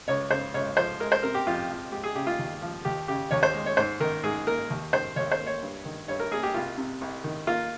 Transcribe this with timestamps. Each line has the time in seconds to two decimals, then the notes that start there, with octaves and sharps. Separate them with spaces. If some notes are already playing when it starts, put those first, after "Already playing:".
0.08 C#2 C#5
0.30 C#3 C5
0.54 C#2 C#5
0.76 F3 C5
1.00 G#3 A#4
1.12 C5
1.23 C3 A#4
1.35 G4
1.47 F2 F4
1.69 F3
1.92 G#3 G4
2.04 G#4
2.16 C#3 G4
2.27 F4
2.39 D#2
2.62 F3
2.85 D#2 G4
3.08 C#3 G4
3.31 D#2 C#5
3.43 C5
3.54 G#3
3.66 C#5
3.77 G#2 C5
4.00 D#3 A#4
4.24 G#2 G#4
4.47 A#3 A#4
4.70 D#2
4.93 D#3 C5
5.16 D#2 C#5
5.31 C5
5.39 A#3
5.47 C#5
5.62 G2
5.85 D#3
6.08 G2 C#5
6.20 A#4
6.31 A#3 G#4
6.43 G4
6.54 C2 F4
6.78 C3
7.01 C2
7.24 D#3
7.47 A#3 F4